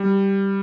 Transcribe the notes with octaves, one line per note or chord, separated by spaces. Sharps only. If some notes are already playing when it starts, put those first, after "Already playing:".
Already playing: G3